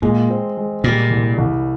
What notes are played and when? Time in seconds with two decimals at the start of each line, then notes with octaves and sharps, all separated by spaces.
0.02 A#2 G#3
0.30 C4
0.57 G#3
0.84 A#2 G3
1.11 C2
1.38 C2